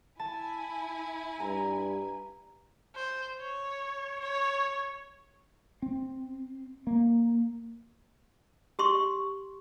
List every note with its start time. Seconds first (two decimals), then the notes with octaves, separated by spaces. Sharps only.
0.20 E4 G#5 A5
1.40 G2 A#5
2.95 C5
3.40 C#5
4.20 C#5
5.82 C4
6.87 A#3
8.79 G4 C6 C#6